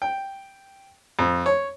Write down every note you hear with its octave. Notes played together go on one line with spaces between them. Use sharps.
G5
F2
C#5